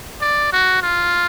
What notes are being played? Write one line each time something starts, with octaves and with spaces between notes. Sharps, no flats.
D5
F#4
F4